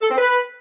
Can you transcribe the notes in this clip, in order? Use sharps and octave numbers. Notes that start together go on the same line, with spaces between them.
A4
C4
B4